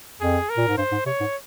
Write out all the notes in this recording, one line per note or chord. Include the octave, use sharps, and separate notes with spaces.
F2 G#4
A#4
A#2
G#2
G2 C5
G#2
C3 C#5
G#2